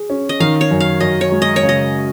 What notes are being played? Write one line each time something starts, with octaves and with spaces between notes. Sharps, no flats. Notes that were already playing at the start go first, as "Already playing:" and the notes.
Already playing: G#4
C#4
D#5
D#3 F5
C#5
F#2
F5
F#2 D#5
C#5
G#3
D#5
C#5
C#3
D#5